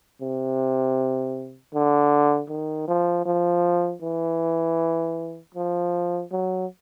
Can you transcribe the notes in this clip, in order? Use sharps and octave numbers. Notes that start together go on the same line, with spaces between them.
C3
D3
D#3
F3
F3
E3
F3
F#3